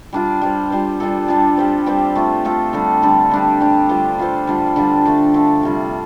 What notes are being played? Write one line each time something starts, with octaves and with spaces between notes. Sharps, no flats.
G3 D4 F4
G3 F4 C5
G3 F4 C5
G3 D4 F4 A4
G3 D4 F4 A4
G3 C4 G4 C5
G3 C4 G4 C5
A3 F4 A4
A3 F4 A4
D3 G3 D4 A4
D3 G3 D4 A4
G3 D4 G4
G3 D4 G4
G3 F4 A4 C5
G3 F4 A4 C5
D3 G3 D4 F4
D3 G3 D4 F4
D3 A3 D4 A4
D3 A3 D4 A4
C3 G3 F4